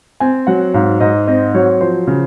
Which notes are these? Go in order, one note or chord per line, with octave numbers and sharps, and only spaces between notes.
C4 G#5
F#3 F#5
G#2 F5
G#2 D#5
C4 D#5
F#3 C#5
F3 C5
C#3